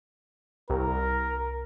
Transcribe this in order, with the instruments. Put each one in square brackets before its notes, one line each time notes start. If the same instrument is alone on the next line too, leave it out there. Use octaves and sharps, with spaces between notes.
[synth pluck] C2 [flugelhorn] A#4